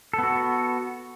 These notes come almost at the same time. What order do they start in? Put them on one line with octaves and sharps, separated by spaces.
A4 B3 F#4